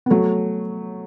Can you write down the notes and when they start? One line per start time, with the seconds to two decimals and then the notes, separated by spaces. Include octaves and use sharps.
0.06 B3
0.10 F#3 A3